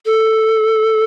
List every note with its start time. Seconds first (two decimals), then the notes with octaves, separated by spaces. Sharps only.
0.06 A4